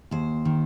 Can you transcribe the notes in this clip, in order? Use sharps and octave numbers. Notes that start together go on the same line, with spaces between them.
D#2 C5
D#3